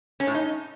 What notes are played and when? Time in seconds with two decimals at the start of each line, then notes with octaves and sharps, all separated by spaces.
0.20 C#4
0.27 A2
0.35 D#4